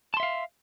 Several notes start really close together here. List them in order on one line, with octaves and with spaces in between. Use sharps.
A5 C6 E5 F5